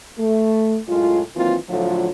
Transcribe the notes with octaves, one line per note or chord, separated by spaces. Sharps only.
A3
F#2 A2 G#3 F4
D#3 E3 F#3 A#3 C4 F4
A2 D3 F3 F#3 F4